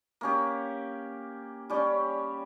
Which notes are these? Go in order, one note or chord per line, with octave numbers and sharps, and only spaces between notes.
A#3 C#4 G4
G3 C#4 G4